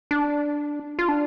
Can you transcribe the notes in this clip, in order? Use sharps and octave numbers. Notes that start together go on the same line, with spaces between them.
D4
F4
D4